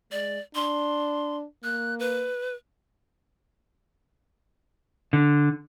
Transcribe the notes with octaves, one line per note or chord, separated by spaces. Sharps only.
G#3 D5
D4 C6
A#3 F#6
B4
D3